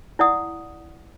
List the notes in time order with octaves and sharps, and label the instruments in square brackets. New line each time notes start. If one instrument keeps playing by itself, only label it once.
[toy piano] E4 D5 F#5 D#6